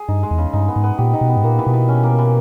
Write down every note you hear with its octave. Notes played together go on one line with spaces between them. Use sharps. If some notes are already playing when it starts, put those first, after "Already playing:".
Already playing: G#4
G2 D#4
G#3
E2
C#3
G2 D#4
B3
G#2
B3
A#2 G4
D#4
B2
B3
G#2
A#2 A#3
E3
B2
E3
C#4
A#3
E3